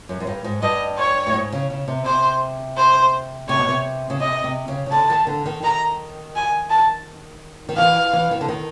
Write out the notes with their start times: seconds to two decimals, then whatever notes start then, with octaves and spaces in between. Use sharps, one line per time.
0.09 F#2
0.20 F#2
0.27 G2
0.44 G#2
0.62 G2 D#5
0.98 C#5
1.27 A2
1.34 G#2
1.52 C#3
1.70 C#3
1.88 C3
2.05 C3 C5
2.77 C5
3.49 C3 C#5
3.59 B2
3.68 C3
4.10 C#3
4.20 C3 D#5
4.44 C3
4.68 C#3
4.86 C#3
4.91 D3 A5
5.10 D#3
5.27 D3
5.46 D#3
5.63 D#3 A#5
6.35 G#5
6.70 A5
7.69 D#3
7.77 E3 F5
8.13 E3
8.31 D#3
8.41 D3
8.48 D#3